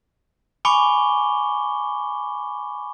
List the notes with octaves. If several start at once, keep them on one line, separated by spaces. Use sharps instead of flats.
G#5 B5 C#6 D6 C#7 G7